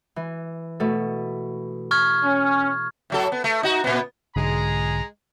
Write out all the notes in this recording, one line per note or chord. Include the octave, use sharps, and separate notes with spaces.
E3
B2 A3 A4
C#6 F6 G#6
C#4
A2 F#3 A4
B3
A3
D#4 F#4
A#2 B3
B1 G#2 D3 G#3 G#4 A#5